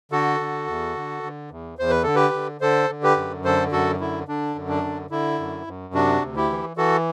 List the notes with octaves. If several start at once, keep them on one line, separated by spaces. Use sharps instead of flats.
D3 F#4 A4
D3
E2
D3
D3
E2
E2 C5
B4
D3 A4
G4 B4
D3
D3 A4 C5
D3
G4 B4
F#2
D3 A4 C5
F#2 F#4 A4
D3 E4
D3 D4
F#2
D4
D3
D3 E4
F#2
F#2
C3 D4 F#4
D2
E4 G4
E3
E3 F#4 A4